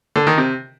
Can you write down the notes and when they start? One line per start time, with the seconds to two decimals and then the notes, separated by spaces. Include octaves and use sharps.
0.16 D3
0.27 D#3
0.38 C3